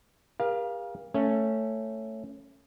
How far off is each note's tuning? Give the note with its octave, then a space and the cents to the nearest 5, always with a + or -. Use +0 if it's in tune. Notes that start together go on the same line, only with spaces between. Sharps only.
G4 +45 A#4 +40 F5 +0
A3 +10 C#4 +0